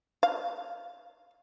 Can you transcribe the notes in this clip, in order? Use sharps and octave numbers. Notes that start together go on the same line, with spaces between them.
F5